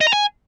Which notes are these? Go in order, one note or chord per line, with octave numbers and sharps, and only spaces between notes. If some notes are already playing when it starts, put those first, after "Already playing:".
D#5
A#5
G#5